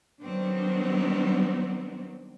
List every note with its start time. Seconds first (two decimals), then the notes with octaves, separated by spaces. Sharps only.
0.22 D#3 F#3 G3 B3 C4 D4